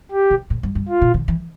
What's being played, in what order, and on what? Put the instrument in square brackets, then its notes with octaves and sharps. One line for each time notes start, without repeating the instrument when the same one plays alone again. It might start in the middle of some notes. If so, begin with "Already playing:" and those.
[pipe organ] G4
[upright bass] C3
A2
G2
G2
[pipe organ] F4
[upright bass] B2
D3
E3